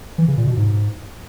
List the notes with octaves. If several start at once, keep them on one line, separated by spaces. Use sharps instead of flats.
E3
C#3
A#2
B2
G#2